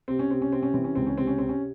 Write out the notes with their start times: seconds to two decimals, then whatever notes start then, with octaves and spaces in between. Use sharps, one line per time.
0.08 C3 C4
0.19 C#4
0.30 C3 C4
0.42 C#4
0.52 C3 C4
0.62 C#4
0.74 E3 C4
0.84 C#4
0.95 C#2 C4
1.06 C#4
1.18 C3 C4
1.27 C#4
1.38 C3 C4
1.49 C#4